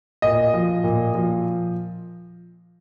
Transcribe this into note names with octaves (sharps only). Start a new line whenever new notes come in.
A#2 D#5
F3
A#2
F3